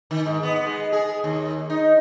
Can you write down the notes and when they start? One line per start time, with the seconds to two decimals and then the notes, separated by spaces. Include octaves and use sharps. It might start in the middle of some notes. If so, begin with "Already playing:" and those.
0.11 D#3
0.26 G#2
0.43 B3
0.66 G#3
0.92 G#4
1.24 D#2
1.70 D#4